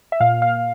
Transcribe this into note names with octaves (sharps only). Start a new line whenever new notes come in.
E5
A#2 F5
F5